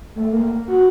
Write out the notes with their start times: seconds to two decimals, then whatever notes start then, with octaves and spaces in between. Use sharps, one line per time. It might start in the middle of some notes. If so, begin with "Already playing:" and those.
0.16 A3
0.33 A#3
0.68 F#4